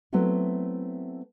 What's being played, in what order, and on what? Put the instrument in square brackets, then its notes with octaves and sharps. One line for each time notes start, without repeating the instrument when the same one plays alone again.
[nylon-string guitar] F#3 A3 B3 C4 E4 F#4